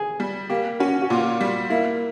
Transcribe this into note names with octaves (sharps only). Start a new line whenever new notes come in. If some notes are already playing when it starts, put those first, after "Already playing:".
Already playing: G#4
G3
A#3 G4
C#4 F#4
F#4
A#2 F4
G3
A#3 E4